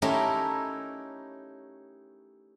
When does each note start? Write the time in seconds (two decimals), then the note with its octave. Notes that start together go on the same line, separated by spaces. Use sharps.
0.02 A3 C#4 D#4 E4 G4 A#4